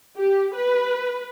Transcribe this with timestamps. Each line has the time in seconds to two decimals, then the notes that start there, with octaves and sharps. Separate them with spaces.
0.16 G4
0.54 B4